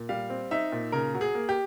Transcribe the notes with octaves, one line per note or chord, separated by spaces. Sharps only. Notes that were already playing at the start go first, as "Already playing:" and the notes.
Already playing: A#2
G3 F5
C4
D#4 E5
A#2
C#3 A#4
F#3
G#4
A#3
G4